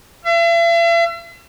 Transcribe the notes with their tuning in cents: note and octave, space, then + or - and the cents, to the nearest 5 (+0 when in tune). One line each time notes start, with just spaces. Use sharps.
E5 +45